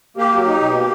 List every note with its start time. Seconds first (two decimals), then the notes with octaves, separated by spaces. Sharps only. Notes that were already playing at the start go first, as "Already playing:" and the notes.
0.17 A#3 G4
0.32 F#3
0.46 D#4
0.60 B2
0.74 A#3